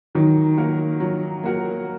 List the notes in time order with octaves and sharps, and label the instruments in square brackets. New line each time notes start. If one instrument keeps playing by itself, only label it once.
[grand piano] D#3 [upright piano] F#3
[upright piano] A#3 F#4 A#4
F#3
A#3 F#4 A#4